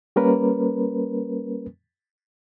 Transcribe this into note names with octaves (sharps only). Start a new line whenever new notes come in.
G3 A#3 C#4 A#4 B4